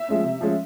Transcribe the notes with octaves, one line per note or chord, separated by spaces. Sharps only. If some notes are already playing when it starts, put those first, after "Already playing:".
Already playing: E5
F3 G#3 C#4
C3
F3 G#3 C#4